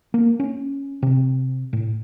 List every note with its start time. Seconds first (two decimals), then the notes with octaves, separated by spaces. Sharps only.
0.14 A#3
0.40 C#4
1.02 C3
1.73 A2